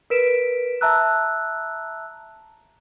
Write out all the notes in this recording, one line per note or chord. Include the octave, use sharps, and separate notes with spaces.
A#4 B4 B6 D7 E7
E5 A5 A#5 E6 F#6